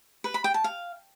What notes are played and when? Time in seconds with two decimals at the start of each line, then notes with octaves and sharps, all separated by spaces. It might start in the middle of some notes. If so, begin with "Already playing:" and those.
0.24 B4
0.34 B5
0.44 G5
0.54 A5
0.64 F5